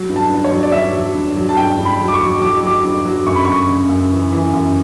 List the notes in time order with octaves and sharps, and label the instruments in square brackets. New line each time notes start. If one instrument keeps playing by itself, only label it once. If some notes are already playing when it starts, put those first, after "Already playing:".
Already playing: [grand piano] F#3
G2
A5
G2
C#5
F#3
D5
G2 E5
F#3
G2
F#3
A5
G2 G5
G2
B5
F#3
D6
C#6
F#3
F#3 D6
F#3 D6
G2
F#3
F#2 C#6
B5
F#2 C#6
C#3
F#2
E3
E3
F#2